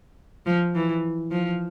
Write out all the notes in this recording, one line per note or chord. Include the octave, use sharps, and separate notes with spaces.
F3
E3
F3